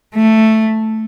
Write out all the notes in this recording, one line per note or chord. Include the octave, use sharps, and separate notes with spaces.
A3